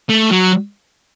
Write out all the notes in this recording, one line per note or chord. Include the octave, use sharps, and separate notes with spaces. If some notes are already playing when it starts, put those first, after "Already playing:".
A3
F#3